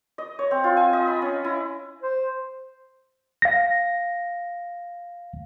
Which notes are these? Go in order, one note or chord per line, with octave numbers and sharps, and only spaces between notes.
D#5
C#5
C4
F4
G#5
D#5
B5
C#4
E4
C5
F5 A#6